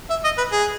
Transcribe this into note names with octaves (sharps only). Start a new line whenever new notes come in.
E5
D#5
B4
G#4